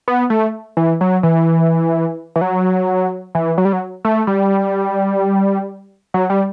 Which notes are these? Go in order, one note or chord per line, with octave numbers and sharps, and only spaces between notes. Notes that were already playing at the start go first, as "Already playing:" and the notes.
B3
A3
E3
F#3
E3
E3
F#3
E3
F#3
G3
F#3
A3
G3
F#3
G3